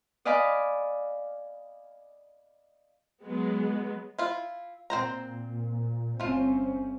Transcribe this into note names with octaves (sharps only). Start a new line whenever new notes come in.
D5 D#5 F5 G#5 B5 D6
F#3 G#3 B3
E4 F4
A#2 C4 C5 A#5
G1 A3 C4 C#4 F4